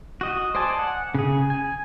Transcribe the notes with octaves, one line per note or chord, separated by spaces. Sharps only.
F#4 D#5
C5 D5 D#5 G#5 A5
F#5
C#3 G#4
G#5